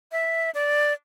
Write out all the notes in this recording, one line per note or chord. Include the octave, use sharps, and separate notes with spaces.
E5
D5